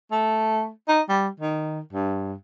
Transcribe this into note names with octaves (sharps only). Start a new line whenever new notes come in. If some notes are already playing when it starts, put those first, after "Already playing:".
A3
D#4
G3
D#3
G2